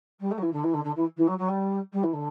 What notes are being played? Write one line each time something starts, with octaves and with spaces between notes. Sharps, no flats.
G3
A3
F#3
E3
D3
E3
D3
D3
E3
E3
F#3
F#3
G3
G3
E3
D3